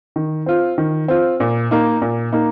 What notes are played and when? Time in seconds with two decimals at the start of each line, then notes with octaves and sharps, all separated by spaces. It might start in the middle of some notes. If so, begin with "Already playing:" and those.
0.16 D#3
0.46 C4 F4
0.78 D#3
1.08 C4 F4
1.40 A#2
1.71 A#3 D#4
2.02 A#2
2.32 A#3 D#4